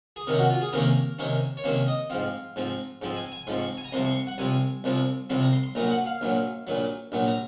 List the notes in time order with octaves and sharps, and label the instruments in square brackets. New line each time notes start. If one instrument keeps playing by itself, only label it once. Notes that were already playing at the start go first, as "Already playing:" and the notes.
[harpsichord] G#4
C3 D#3 A#3 C#4 A#4
F#4
F4
G#4
C3 D#3 A#3 C#4 A#4
C3 D#3 A#3 C#4
C#5
C3 D#3 A#3 C#4 C5
D#5
G#2 F3 C4 F5
G#2 F3 C4
G#2 F3 C4
G#5
G#5
G#2 F3 C4 C6
C#6
G#5
A#5
C2 C3 F3 C4 C6
C#6
C6
C#6
F#5
C2 C3 F3 C4 G#5
C2 C3 F3 C4
C2 C3 F3 C4 C6
A#5
C6
C6
A#1 A#2 F#3 A#5
F#5
F5
A#1 A#2 F#3
A#1 A#2 F#3
A#1 A#2 F#3
A#5